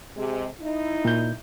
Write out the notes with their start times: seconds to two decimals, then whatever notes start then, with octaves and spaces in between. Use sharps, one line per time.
0.16 C3 G#3
0.60 D#4 E4
1.05 A#2 G6